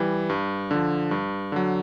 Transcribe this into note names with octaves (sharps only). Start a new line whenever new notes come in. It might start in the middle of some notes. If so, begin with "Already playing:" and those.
Already playing: E3 G3
G2
D3 F3
G2
D3 F#3